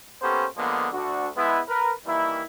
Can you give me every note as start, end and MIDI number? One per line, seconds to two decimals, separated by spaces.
0.22 0.45 58
0.22 0.45 59
0.22 0.45 61
0.22 0.45 67
0.22 0.45 69
0.22 0.45 72
0.57 0.87 50
0.57 0.87 53
0.57 0.87 56
0.57 0.87 58
0.57 0.87 59
0.93 1.27 38
0.93 1.27 62
0.93 1.27 66
1.36 1.59 56
1.36 1.59 59
1.36 1.59 64
1.67 1.91 70
1.67 1.91 71
2.06 2.42 51
2.06 2.42 52
2.06 2.42 55
2.06 2.42 58
2.06 2.42 64